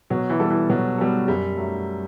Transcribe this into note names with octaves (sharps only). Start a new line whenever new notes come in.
B2 F#3
E3
G3 B3 F#4 A4
E3
B2 F#3
G3 B3 F#4 A4
F#2 G3
F#3 A3